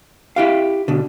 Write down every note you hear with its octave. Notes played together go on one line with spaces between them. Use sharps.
E4 G4 F5
B2 D3